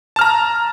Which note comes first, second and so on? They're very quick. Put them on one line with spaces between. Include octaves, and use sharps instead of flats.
A5 F6 A#5